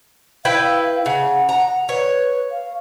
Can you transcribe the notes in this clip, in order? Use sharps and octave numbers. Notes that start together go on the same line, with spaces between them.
E4 B4 F5 G5
C#3 F#5
A#5
B4 C#5
F5